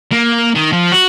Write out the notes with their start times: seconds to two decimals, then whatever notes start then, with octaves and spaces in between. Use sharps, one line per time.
0.11 A#3
0.55 D#3
0.72 F3
0.92 F#4